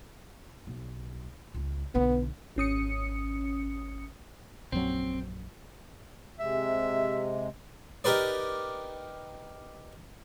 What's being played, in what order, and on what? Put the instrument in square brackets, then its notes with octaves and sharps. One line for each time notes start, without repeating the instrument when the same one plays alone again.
[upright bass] B1
C#2
[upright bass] B1 D3 [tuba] B3
[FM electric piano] G#1 C#4 D#6 C#7
[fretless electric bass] A#1 F#2 F#3 [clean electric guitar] C4
[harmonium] C3 G#3 [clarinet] E5
[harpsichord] D#4 G4 A#4 B4 D5